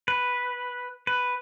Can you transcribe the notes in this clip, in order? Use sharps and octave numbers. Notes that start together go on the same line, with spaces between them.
B4
B4